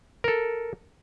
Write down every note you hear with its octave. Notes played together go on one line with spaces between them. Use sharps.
A4 A#4